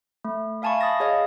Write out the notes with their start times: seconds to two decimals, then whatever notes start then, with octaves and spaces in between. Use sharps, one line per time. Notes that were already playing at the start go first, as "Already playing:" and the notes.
0.25 A3
0.62 E5 F5 G#5 A5 B5 C#6
0.81 A5 B5 D#6 A6 A#6
1.00 G#4 C#5 D#5 F5 D#6